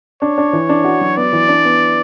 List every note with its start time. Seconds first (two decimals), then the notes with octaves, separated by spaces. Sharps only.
0.22 D4 C#5
0.38 D4
0.53 E3
0.69 D4
0.85 F#4
1.01 F#3
1.17 B3 D5
1.33 E3
1.48 D4
1.65 B3